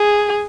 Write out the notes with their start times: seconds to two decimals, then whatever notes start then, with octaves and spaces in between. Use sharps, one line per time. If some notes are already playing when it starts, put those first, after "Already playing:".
Already playing: G#4